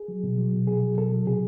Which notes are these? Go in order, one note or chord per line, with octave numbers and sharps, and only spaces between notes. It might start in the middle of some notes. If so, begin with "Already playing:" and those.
Already playing: G#4
F#3
B2
F#3
B2
B2 G#4
F#3
B2 A4
F#3
C3 G#4